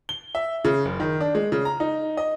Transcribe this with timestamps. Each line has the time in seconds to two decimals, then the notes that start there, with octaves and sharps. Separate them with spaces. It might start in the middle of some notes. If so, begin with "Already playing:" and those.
0.09 G7
0.35 E5
0.65 C#3
0.85 F#1
1.00 D#3
1.20 D4
1.35 G#3
1.52 C#3
1.65 A#5
1.80 D#4
2.17 D#5